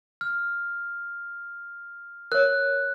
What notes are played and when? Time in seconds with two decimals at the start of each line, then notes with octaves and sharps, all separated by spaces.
0.21 F6
2.32 A#4 C#5 F#6